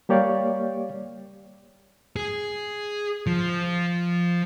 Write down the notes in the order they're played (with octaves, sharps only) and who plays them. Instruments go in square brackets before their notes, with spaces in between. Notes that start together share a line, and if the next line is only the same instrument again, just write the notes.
[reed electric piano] G3 A#3 G4 C#5 D5 F5
[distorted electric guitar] G#4
F3